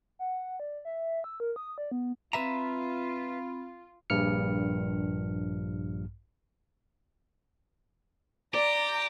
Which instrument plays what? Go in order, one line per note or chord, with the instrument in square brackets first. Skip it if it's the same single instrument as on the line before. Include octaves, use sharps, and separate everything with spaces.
[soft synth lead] F#5
D5
E5
E6
A#4
D#6
D5
B3
[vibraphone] C4 B5 [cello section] F4 [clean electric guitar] B4 E5 A#5
[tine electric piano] A#1 G2 F6 C#7
[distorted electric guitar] G4 [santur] D5 [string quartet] A#5